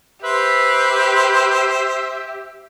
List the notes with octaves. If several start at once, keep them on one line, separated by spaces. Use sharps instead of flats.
G4 B4 C5 E5